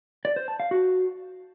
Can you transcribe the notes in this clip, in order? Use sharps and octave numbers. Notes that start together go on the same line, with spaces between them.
D5
C5
A5
F5
F#4